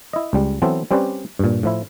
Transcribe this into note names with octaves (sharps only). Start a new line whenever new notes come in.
E4 D#5
C#2 G3
E3 F#3 B3 C4 A4
G3 C4 C#4 G4 B4 D5
G2 A#2
A2 F3 E4